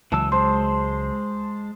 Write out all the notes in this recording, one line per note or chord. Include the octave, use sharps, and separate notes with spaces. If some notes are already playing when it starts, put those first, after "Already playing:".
C#2 E3 F#3 A5 E6
G#3 C5 A5